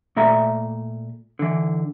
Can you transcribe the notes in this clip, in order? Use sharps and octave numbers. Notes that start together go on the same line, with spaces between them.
A#2 A3 E5 A#5
D3 E3